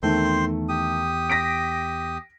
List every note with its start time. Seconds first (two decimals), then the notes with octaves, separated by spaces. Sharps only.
0.03 E2 D#3 A3 C4 C5 C6
0.69 G4 D#6
1.30 A#6 B6 D7